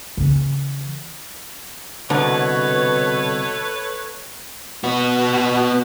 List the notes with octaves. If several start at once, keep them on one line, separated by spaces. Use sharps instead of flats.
C#3 E3
C2 B2 D3 A4 B4 C#5
B3 F#4